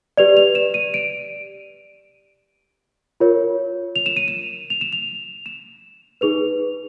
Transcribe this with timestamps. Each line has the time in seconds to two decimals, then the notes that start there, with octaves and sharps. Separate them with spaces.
0.17 G4 B4 D5 F7
0.37 F7
0.55 E7
0.74 D#7
0.94 D7
3.20 F4 A#4 C#5
3.96 F7
4.06 E7
4.17 D#7
4.28 E7
4.70 F7
4.81 E7
4.92 F7
5.46 E7
6.21 D#4 G#4 B4 F7